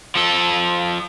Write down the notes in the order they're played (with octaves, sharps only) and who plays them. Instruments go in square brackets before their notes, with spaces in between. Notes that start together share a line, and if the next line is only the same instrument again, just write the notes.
[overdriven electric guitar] F3 A4